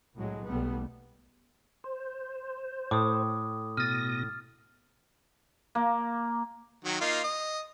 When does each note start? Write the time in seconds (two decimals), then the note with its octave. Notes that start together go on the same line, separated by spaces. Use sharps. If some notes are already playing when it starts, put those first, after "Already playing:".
0.15 C2 A2 F#3 G#3
0.46 B1 G3 A3 B3
1.84 C5
2.91 A2 D6 D#6
3.77 B2 D#6 F6 A6 A#6
5.75 A#3
6.84 D#3 F#3
7.01 A#3 D#4 F4
7.24 D#5